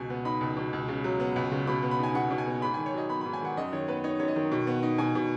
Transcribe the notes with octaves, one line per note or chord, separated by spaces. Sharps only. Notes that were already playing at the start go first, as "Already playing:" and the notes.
Already playing: C#2 B2 G#5
B3
D#4 B5
C#2
B2
C#2
C#3
F#3
B3
C#2
C#3
B2 B5
B3
B5
D#4 G#5
B2 F#5
B2
G#5
B3
G#2 B5
G#5
D#3
C#5
F#3 D#5
B3 B5
B5
G#2
G#5
D#3 F#5
F#2 D#5
D#3 C#5
B3 B4
D#4 C#5
F#2 C#5
D#5
D#3
B2
B3
D#4
B2 G#5
B2